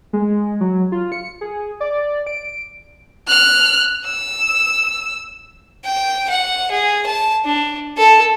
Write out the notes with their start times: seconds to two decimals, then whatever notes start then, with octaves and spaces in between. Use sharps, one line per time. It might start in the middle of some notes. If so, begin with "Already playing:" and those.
0.13 G#3
0.61 F#3
0.92 F4
1.12 C#7
1.41 G#4
1.80 D5
2.27 D7
3.27 F6 F#6
4.05 E6
5.85 G5
6.30 F#5
6.71 G#4
7.06 A5
7.45 D4
7.98 A4